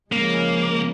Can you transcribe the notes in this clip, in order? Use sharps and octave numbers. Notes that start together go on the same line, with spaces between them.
C#3 F3 G#3 A#3